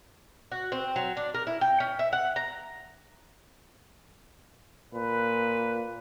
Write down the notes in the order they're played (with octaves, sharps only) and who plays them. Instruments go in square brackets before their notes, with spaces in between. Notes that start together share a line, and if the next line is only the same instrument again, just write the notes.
[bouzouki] F#4
C4
F#3
D4
A#4
E4
G5
C#4
E5
F#5
A#5
[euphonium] A#2 [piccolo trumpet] B4